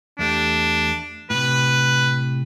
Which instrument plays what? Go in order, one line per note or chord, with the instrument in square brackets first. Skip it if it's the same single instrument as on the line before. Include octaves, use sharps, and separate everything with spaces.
[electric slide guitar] E2 A3 G4 [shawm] D4
[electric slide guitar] A2 C3 [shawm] B4